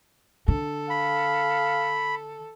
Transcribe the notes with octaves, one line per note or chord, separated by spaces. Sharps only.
D3 A4
F5 B5